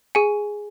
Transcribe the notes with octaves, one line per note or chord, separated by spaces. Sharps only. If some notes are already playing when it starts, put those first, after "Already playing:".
G#4 G#5